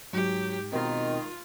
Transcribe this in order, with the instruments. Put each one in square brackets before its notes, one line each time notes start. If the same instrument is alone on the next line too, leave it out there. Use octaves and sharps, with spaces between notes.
[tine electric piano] G#2 [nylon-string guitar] F#3 [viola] G4
[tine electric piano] B2 C4 [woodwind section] D#3 [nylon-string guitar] G#3 [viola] F4